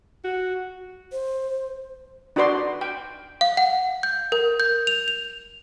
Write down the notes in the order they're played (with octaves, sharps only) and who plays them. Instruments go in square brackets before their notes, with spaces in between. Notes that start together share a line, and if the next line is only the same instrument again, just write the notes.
[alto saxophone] F#4
[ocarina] C5
[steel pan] D4 D#4 F#4 B4 D5 C6
G5
[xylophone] F5
F#5
G6
A#4
G6
F7
F7